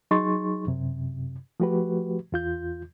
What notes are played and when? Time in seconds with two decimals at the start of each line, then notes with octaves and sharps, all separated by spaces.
0.11 F#3 D#4 G#4 C6 C#6 A6
0.67 F#2 C3
1.60 F3 A3 F#4 G4 B4
2.32 E2 F4 G6